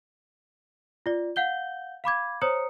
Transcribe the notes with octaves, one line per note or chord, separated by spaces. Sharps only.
F4 D5
F5 F#5 G6 G7
F5 B5 D6 G#6
C5 C#5 A#5 D#6 C#7